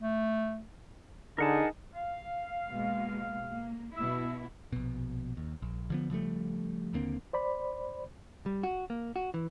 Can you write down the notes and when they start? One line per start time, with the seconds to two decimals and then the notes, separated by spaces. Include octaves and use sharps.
0.01 A3
1.38 D3 D#4 G#4 A#4 F#5 A5
1.94 F5
2.69 B2 G#3 A#3
3.48 A#3
3.96 B2 E4 E6
4.73 A#1 B2
5.37 D#2
5.62 A#1
5.90 D3 F3 B3
6.10 C#3 F3 G3 A3
6.93 D#2 D3 A#3 C4
7.33 C5 D5 B5
8.46 G3
8.63 F#4
8.90 A#3
9.16 F#4
9.34 E3